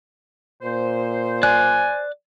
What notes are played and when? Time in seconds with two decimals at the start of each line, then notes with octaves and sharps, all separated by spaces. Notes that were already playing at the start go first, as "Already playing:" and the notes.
0.62 A#2 C5
1.43 D5 G#5 F#6